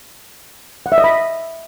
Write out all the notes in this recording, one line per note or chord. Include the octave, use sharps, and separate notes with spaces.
F#5
E5
D#5
B5